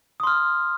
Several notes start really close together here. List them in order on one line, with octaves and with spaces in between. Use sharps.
D#6 C6 F6